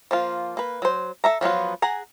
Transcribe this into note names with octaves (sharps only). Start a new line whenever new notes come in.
F3 A#3 F4
A#3 B4
F#3 C5
A4 E5 A#5
F3 F#3 B3 F4
G#4 F#5 G#5 A#5